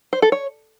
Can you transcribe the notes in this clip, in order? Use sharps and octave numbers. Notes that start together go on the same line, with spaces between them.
C5
A4
C#5